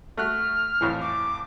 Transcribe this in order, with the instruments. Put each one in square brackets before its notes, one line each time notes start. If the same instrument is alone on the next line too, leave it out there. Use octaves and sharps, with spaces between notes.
[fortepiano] A3 F#4 F#6 [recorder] F6
[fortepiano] F2 A2 E3
[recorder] D6